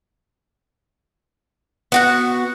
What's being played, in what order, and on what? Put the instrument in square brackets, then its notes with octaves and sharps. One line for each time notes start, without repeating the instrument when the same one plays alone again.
[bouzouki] B3 F#4 F#5